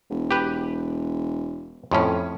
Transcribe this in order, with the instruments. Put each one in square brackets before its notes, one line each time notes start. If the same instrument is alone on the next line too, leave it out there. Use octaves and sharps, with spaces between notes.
[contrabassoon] E1
[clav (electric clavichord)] G4 B4
F2 A2 C#4